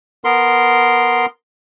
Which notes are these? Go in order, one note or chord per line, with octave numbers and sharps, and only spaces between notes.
B3 A#4 C6